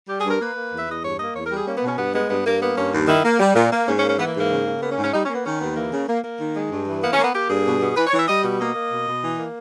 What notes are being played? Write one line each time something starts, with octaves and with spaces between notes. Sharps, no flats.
G3 G4
G#4
G2 A#4
A#3 B4
A#3
E2
E5
E2 D#5
G2 C#5
A#3 D#5
E2 C#5
A#4
G3
G#4
A#3 C#4
B3
B2 C#4
G2 B3
G#3 B3
G2 B3
G2 A#3
A#3 B3
G2 C#4
D#2
D#3 E4
A#3
G3
A#2
A#3
G#2 C#4
C#4
A#3
C#4
E3 B3
A#3
G#2
A#3
C#3
C#3
A#3 B3
C#4
G#2
C#4
G3 D#4
C#4
A#3
B3
D#3 C#4
D#2 B3
E3 A#3
C#3
A#3
A#3
D#3
G#3
G2
E3
A#3 B3
C#4
A#3
B3
A#3 G4
G2 G#4
B2
B2
E3 B4
C#5
E3
E5
G3 D#5
B2
A#3 D#5
A#3
B2
B2
E3
A#3